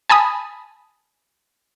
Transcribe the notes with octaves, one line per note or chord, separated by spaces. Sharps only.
G#5 A5 B5 D#6